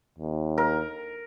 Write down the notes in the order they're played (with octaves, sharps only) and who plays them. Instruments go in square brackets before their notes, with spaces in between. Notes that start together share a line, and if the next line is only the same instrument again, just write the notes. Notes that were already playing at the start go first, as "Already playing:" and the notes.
[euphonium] D#2
[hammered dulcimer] A#4